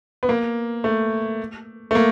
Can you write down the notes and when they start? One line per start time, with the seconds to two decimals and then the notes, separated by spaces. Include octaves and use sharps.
0.23 B3
0.29 A#3
0.84 A3
1.91 A3
1.95 A#3